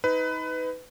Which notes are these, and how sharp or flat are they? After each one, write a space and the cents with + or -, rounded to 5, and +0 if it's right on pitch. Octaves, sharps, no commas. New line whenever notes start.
D#4 +30 B4 +20